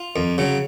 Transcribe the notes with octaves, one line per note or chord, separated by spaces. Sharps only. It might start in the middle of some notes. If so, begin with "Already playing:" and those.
Already playing: F4
F2
C#3 F#3